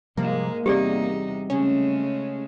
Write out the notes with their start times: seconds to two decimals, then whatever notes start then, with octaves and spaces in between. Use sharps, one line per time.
0.17 G#2 C3 F3 G3 G#3 A#3
0.66 E2 C3 G3 C4 D#4 G4 G#4 D5
1.50 C#3 G#3 A3 C#4